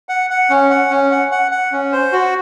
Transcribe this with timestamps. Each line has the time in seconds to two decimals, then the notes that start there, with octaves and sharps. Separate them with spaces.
0.09 F#5
0.30 F#5
0.50 C#4
0.70 F#5
0.90 C#4
1.11 F#5
1.31 F#5
1.51 F#5
1.72 C#4
1.93 C5
2.12 F#4